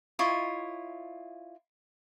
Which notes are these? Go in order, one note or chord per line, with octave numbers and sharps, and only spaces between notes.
E4 F4 C#5 D#5